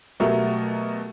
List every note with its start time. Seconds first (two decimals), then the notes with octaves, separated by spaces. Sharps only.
0.20 B2 F#3 A3 G4 A#4